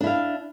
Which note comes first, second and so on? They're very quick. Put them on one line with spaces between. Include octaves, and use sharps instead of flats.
D4 E4 F5